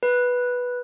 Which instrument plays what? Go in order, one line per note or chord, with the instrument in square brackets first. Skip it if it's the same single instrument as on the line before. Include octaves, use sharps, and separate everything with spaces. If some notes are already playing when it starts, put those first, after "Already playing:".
[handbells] B4